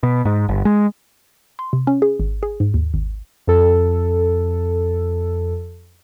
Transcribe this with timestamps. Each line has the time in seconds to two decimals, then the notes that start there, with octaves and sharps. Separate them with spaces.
0.03 B2
0.25 G#2
0.49 G1
0.65 G#3
1.59 C6
1.73 C3
1.87 C#4
2.02 G#4
2.20 G#1
2.43 G#4
2.60 G#2
2.74 D#2
2.94 G#1
3.47 F2 A4